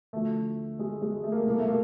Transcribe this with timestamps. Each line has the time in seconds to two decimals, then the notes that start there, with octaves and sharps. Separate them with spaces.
0.13 D2 D3 F3 A3
0.79 G#3
1.02 G#3
1.24 A3
1.32 A#3
1.41 A3
1.46 C2 B2 A#3
1.59 A3
1.68 A#3